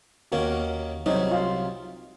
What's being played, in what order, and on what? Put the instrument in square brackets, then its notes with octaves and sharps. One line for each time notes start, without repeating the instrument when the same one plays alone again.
[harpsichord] D#2 D#3 A#3 C#4 [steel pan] F#4
[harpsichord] C2 C3 F#3 C#4 [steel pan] D#4
[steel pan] F4